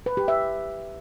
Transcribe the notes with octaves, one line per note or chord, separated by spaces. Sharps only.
B4
G4
E5